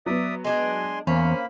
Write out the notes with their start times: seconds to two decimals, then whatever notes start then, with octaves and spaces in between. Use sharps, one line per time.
0.06 F#3 B3 D5 E5 D#6
0.44 G#3 D4 G#4 G#5 C6
1.07 E2 A#3 C#4 C5 F5 B5